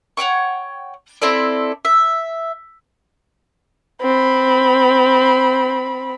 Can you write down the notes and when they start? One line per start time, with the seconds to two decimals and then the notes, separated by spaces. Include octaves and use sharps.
0.17 C#5 F#5 G5 C#6
1.22 C4 E4 A4 D5
1.85 E5
4.01 C4 B5